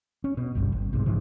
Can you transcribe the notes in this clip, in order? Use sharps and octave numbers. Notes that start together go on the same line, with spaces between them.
C#4
B2
G1 C2 G2
G1
B1 G#2 C3
G#2 C#3 E3 F3